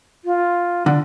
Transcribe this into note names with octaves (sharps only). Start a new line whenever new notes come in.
F4
D3 D4